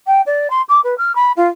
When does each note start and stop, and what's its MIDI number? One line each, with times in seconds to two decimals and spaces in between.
0.07 0.21 79
0.26 0.50 74
0.50 0.61 84
0.69 0.80 86
0.84 0.94 71
0.98 1.15 89
1.15 1.32 83
1.36 1.48 65